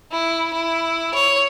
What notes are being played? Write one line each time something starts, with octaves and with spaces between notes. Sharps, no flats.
E4
E4
C#5